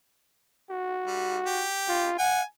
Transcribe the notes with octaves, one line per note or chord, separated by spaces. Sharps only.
F#4
G3
G4
F4
F#5 G#5